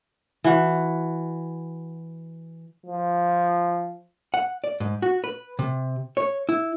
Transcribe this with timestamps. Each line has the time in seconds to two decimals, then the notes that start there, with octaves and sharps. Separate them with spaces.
0.44 E3 F#4
2.86 F3
4.34 F#5
4.64 D5
4.80 G#2
5.02 F#4
5.24 B4
5.59 C3
6.17 C#5
6.49 E4